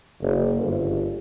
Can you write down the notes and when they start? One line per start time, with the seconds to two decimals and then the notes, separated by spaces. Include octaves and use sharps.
0.21 F#1
0.62 G1